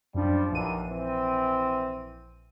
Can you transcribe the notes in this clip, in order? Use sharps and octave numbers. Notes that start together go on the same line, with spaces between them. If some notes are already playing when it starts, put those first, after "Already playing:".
F#2 F3 G3 D4
A#1 D#2 D3 E3 D#7
E3 C4